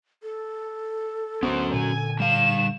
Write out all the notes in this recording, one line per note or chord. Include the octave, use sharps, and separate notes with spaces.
A4
D2 A#3 B3 C#4 F#4 C5
A#2 D3 G#5
G3 F5 E7